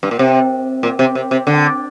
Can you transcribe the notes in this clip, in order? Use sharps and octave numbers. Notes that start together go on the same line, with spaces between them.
G2
A#2
C3
A#2
C3
C3
C3
D3